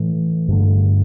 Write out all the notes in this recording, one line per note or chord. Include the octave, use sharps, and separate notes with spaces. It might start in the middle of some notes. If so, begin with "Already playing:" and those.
Already playing: A2 E3 A3
G2 D3 A3